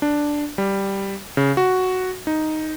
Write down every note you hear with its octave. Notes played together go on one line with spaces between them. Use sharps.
D4
G3
C#3
F#4
D#4